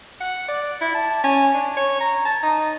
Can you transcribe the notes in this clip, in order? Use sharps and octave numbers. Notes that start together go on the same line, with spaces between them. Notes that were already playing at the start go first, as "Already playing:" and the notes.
F#5
D5
E4
A5
C#4
D4
C#5
A#5
A5
D#4